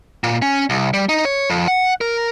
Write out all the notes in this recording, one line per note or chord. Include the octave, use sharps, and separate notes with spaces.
A#2
C#4
C2
G3
D#4
C#5
F2
F#5
A#4